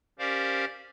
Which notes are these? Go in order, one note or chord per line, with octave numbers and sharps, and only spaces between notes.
C#4 G4 A#4 C5 D5 F5